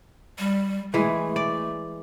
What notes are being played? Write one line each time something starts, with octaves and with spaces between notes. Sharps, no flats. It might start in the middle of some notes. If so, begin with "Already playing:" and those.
G3
E3 G#3 A3
D5